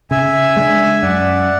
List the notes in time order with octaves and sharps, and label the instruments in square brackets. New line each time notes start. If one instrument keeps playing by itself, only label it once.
[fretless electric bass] C#3 [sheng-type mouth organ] E5 G#5
[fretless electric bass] G#3 D4
[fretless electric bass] F#2 [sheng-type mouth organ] D5 F#5